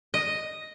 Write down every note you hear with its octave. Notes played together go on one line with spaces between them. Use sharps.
D#5